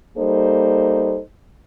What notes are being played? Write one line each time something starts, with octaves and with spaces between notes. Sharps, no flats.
G3 A#3 D#4 A4 C5